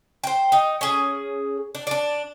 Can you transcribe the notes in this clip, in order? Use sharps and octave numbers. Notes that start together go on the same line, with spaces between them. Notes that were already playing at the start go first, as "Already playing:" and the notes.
C5 G5
D#4
C#4 G#4
D4
D4 D5